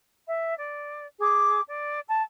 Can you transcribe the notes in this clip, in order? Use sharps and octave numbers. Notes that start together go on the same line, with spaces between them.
E5
D5
G#4 D6
D5
A5